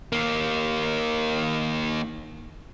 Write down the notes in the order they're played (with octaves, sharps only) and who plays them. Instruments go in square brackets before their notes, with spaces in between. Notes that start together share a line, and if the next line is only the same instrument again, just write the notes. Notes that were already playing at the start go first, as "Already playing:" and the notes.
[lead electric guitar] D#3 A#3